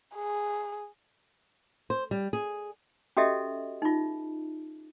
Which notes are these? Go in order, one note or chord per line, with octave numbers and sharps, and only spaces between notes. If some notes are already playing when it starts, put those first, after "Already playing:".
G#4
C5
G3
G#4
C#4 F#4 G4 A4 D#5 E5
D#4 F4